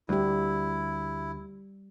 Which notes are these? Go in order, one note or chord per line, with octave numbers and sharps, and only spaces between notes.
D2 G3 E4 G4